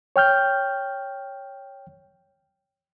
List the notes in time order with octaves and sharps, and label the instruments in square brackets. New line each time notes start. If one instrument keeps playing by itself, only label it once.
[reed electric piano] C#5 G5 F6 G6